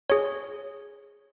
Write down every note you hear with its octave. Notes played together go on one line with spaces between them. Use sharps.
G#4 C#5